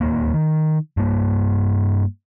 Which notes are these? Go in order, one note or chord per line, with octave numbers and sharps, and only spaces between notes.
D1 D#2 A#3
D#3
G2 A#3